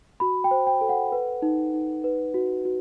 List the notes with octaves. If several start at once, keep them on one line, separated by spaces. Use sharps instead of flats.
F#4 B5
G5
C5
G5
A4
F#5
B4
D#4
D#4
B4
F#4
F#4